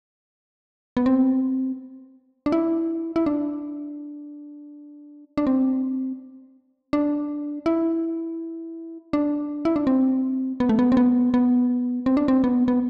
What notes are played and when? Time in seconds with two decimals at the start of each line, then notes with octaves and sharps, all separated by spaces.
0.97 B3
1.06 C4
2.46 D4
2.52 E4
3.16 E4
3.26 D4
5.37 D4
5.47 C4
6.93 D4
7.66 E4
9.13 D4
9.65 E4
9.76 D4
9.87 C4
10.60 B3
10.69 A3
10.79 B3
10.92 C4
10.97 B3
11.34 B3
12.06 C4
12.17 D4
12.28 C4
12.44 B3
12.68 B3